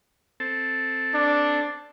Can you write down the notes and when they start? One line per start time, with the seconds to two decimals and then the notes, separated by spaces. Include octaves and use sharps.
0.40 C4 A4 A5
1.14 D4